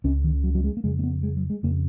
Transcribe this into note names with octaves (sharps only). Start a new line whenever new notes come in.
C#2 C#3 C#4
D#3
F#3
F#3
G#3
A#3
F2 C#3 G#3
A#3
B3
G#3
F#3
G#3
F2 C#3 A#3